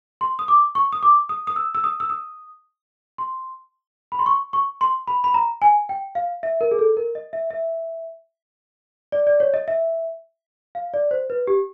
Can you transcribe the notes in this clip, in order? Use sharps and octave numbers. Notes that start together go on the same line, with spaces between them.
C6
D#6
D6
C#6
D#6
D6
D#6
D#6
E6
E6
D#6
E6
D#6
C6
B5
C6
C#6
C#6
C6
B5
B5
A#5
G#5
G5
F5
E5
A#4
G#4
A4
A#4
D#5
E5
E5
D5
D5
C#5
D#5
E5
F5
D5
C5
B4
G4